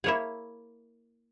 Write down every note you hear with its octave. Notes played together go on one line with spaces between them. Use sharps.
A#3 E4 G#4 C#5 E5